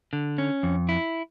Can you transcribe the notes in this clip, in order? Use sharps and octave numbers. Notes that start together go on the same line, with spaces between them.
D3
C#4
F2
E4